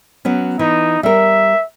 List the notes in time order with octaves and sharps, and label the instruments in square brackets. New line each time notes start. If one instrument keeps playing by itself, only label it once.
[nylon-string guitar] F#3 B3 C#4
[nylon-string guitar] E3 [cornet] D#4
[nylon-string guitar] G3 A#4 [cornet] E5